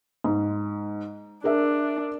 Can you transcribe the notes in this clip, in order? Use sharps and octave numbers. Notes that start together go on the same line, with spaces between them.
G#2
D4 G#4 A#4 E5